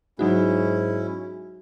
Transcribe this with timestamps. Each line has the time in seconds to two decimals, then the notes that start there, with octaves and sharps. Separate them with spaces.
0.19 G#2 F#3 C#4 D#4 E4 F#4